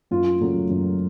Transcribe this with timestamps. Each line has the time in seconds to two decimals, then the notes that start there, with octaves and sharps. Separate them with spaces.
0.11 F#2 F4
0.41 C#3 F#3 A3
0.70 F#2